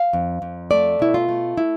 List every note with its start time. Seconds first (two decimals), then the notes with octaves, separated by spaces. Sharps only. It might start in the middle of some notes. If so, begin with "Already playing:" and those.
Already playing: F5
0.13 F2
0.42 F2
0.71 A3 D5
0.99 B2 E4
1.14 F4
1.29 A3
1.57 E4